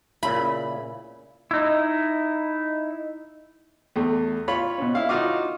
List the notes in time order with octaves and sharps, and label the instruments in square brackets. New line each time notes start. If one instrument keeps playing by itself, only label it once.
[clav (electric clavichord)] A#2 C#3 E4 [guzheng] B5
[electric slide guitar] D#4 E4
[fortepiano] E2 A3
F4 C#5 B5
B2 C#4
E4 F5
D#4 F4 F#4 F5 D6